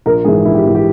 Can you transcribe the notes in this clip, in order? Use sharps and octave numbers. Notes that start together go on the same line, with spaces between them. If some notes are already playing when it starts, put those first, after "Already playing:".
A#1 A#4
G#2 E3 G#4
A#1 E4
G4
G#2 E3
G4